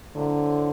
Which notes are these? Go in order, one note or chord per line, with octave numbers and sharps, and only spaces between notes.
A2 D3 F#3 A3 C4